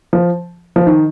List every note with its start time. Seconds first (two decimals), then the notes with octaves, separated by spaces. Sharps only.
0.13 F3
0.76 F3
0.87 D#3